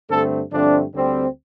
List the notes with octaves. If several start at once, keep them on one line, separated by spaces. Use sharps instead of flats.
G2 D3 A3 C4 A4
G2 D3 F3 A3 C4 D4
D2 D3 G3 C4